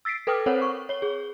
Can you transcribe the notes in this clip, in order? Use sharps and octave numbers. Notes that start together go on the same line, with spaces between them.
E6 A6 B6 C7 D7
A4 B4 G5 D6 D#6 F6
C4 A4 A#4 C5 C#5 F#5
C#6
C#5 G7
G#4